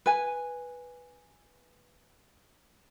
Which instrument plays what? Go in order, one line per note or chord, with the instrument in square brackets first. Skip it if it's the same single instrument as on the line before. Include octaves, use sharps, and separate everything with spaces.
[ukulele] B4 G#5